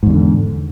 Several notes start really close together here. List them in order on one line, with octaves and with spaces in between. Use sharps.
G#2 E2 B2 D3